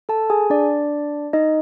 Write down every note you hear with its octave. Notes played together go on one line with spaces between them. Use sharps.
A4 A5
G#4 G#5
D4 D5
D#4 D#5